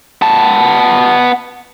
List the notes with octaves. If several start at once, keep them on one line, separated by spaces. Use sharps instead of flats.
B3 A5